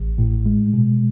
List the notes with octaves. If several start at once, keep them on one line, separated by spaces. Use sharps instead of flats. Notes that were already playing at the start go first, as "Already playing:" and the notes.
Already playing: A1
A2
G#3
B2